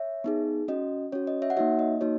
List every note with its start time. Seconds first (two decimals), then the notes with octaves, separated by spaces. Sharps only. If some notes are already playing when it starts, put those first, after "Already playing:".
Already playing: C#5 E5
0.24 B3 D#4 G#4
0.68 C#4 F#4 D#5
1.12 C#4 F#4 C#5
1.27 D#5
1.42 C#5 E5
1.50 F#5
1.57 A#3 D#4 F#4 C#5 E5
1.79 D#5
2.01 A#3 D#4 F#4 C#5